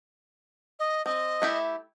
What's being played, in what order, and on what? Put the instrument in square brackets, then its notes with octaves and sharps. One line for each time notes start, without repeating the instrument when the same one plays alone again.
[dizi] D#5
[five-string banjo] C4 [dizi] D#5
[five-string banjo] A3 E4 G4